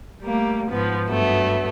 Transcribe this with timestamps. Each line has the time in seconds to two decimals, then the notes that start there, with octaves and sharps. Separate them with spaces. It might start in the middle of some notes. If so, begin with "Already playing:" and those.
0.22 G3 A3 A#3
0.71 G#2 F3 B3
1.08 G2 F#3 A3 B3